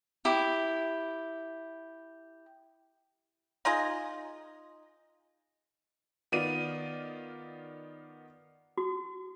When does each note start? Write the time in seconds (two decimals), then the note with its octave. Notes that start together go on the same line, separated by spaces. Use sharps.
0.25 E4 G4
3.65 D#4 F4 G#4 D#5
6.32 D#3 B3 F4 D5 D#7
8.78 F#4